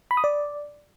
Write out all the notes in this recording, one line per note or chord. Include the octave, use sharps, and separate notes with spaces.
B5
D#6
D5